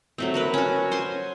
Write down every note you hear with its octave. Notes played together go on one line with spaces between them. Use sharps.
F#3 A3 C4
F#4 A#4 B4
C#4 F#4
C5 G#5 C6